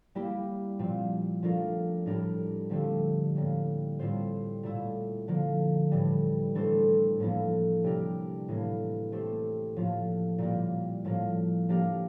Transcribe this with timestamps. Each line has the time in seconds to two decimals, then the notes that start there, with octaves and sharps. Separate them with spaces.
0.15 G3 A#3 E4 G4
0.79 A#2 F3 C4
1.43 F3 A3 D4 F4 A#4
2.06 A2 G3 D4 G4 A#4
2.70 D3 F3 A3 C4 G4
3.36 A2 G3 A#3
3.99 A2 G3 C4 F4 C5
4.63 A#2 A3 E4
5.28 D3 F3 A#3
5.91 A2 E3 G3
6.55 E3 A3 D4 A4 C5
7.20 A2 F3 A#3 E4 A4
7.84 C3 G3 D4 G4 A#4
8.48 A2 E3 A#3
9.12 A3 C4 G4 C5
9.76 A2 F3 A#3 F4
10.38 A#2 G3 A#3
11.05 A2 F3 A#3
11.69 F3 A#3 D4 G4 A#4